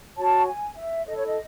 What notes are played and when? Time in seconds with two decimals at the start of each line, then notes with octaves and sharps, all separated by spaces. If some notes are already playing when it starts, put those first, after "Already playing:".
0.17 F#4 C#5 A5
0.47 G#5
0.76 E5
1.05 E4 A4 C#5 D#5
1.16 C#5
1.27 D#5